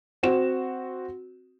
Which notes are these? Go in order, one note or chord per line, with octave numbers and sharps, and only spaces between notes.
C4 F#4 E7